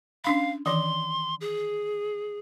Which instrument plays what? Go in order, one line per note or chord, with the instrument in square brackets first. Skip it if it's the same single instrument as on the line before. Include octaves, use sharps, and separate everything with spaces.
[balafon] C#4 D4 B5 [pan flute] F5
[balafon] D#3 E3 [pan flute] C6
[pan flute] G#4